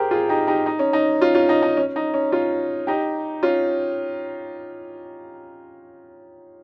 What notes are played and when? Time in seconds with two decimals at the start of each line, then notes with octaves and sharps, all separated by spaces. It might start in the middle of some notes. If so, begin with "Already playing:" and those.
Already playing: G4 G#4 A#4 C5
0.11 F4 G#4
0.29 D#4 G4
0.47 D#4 G4
0.66 D#4
0.79 C#4
0.93 D#4
1.21 C#4 F4
1.35 C#4 F4
1.49 D#4
1.62 D#4
1.77 C#4
1.96 D#4
2.14 C#4
2.32 C#4 F4
2.87 D#4 G4
3.43 C#4 F4